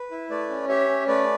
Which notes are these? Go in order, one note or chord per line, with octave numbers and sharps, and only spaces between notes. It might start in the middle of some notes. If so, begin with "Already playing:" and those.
Already playing: B4
E4
A3 B4 D5
C#4
G4 C#5 E5
C#4
A3 B4 D5